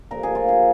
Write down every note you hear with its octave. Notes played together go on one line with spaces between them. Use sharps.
A#2 F3 A#4
G#4
F4
G#4